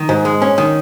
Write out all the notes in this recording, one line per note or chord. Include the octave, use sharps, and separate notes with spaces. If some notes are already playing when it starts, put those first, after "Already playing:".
Already playing: D#3
G#2
G#3
C#4
D#3